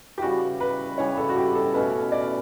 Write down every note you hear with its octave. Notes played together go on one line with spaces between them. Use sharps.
G4
C#3 E3 G3 F#4
B4
C#3 E3 G3 C#5
A4
F#4
G4
A4
B2 A3 C#4 B4
D5